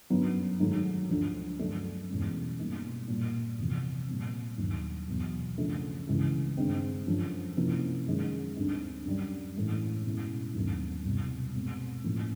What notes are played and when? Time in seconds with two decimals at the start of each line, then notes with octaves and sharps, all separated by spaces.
0.10 F#2 D3 F#3 B3 D#4
0.60 G#2 D#3 F#3 A3
1.09 D2 D3 F3
1.59 G2 D3 F#3 A3 D4
2.09 E2 B2 G#3 C#4
2.59 B2 G3 A#3 D#4
3.08 A#2 G3 A#3
3.58 E2 C3 F3
4.08 A#2 G3 C4
4.58 D#2 D3 F#3
5.07 E2 B2 F#3
5.58 C#3 F3 A3 D4
6.07 C#2 C#3 E3 G#3 C#4
6.57 G2 D#3 G#3 C4
7.07 F#2 D3 F3
7.57 C3 F3 A#3 C#4 E4
8.06 F#2 D#3 G#3
8.56 D2 D3 G3 C4 D#4
9.05 F#2 D3 G3
9.56 A2 E3 G#3 C#4 E4
10.05 B2 G#3 C#4 E4
10.55 D#2 D3 F#3 A3 C4
11.05 C2 B2 G3
11.55 B2 G#3 C4
12.04 A2 F3 A#3 C#4